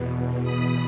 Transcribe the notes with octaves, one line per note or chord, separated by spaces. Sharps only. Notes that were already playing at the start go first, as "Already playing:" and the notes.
Already playing: E2 B2
B5 D#6